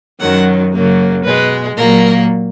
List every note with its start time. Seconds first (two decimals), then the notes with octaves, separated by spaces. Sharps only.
0.20 F#2 D#3 F#3 F#5
0.73 F#2 C#3 F#3 A#3
1.25 B2 G#3 B4
1.77 A#2 F#3 A#3 A#4